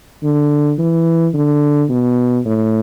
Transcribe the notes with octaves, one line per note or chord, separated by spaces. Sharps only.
D3
E3
D3
B2
A2